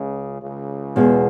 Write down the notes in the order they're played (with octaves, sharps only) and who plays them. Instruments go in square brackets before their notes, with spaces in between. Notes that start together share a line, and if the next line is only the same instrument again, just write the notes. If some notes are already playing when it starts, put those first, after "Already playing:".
Already playing: [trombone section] C#2 C#3
C#2 C#3
[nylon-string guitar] E2 B2 G#3